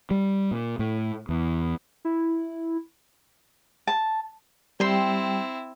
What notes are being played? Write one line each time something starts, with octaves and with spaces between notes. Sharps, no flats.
G3
A#2
A2
E2
E4
A5
G3 C4 E4 G5 C6